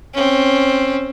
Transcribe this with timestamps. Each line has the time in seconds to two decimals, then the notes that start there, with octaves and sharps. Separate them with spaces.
0.14 C4 C#4